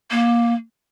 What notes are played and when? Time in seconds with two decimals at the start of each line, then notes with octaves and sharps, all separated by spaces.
0.11 A#3